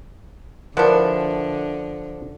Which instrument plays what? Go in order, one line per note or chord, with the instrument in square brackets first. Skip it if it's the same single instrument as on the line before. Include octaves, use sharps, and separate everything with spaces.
[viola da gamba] D3 [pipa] E3 D4 [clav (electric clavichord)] F3 F#5 [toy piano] A#4 D5